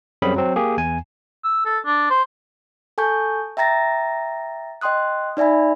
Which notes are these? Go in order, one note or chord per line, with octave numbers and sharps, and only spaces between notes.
F#2 G3 C4 C#4 G#4 B5
F#3 C4
A#3 G4 G#4
E2 G#5
E6
A4
D4
C5
A4 G#5 A5 C#6 G6
E5 G5 A#5 A6 A#6
D#5 G5 C6 D#6 F#6
D#4 D5 E5 G#5 B5